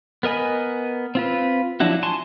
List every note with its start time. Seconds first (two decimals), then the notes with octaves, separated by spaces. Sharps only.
0.23 B3 A#4 D#5 G#5 B5
1.15 C4 F4 B4
1.80 F3 F#3 D4 E4 F#4
2.03 G#5 A5 C6 C#6